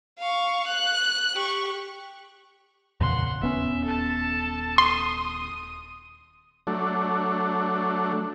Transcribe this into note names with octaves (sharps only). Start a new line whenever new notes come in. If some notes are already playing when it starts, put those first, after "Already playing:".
F5 C#6
F#6
G4 C#6
E2 A#2 C#3 F#5 C6
D#1 B3 C#4 E5
A4 A5
C6 D#6
F#3 A3 D4